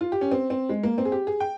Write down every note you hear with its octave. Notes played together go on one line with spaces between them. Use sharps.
F4
G4
C#4
C4
C4
G#3
A#3
C4
G#4
G4
G#4
G5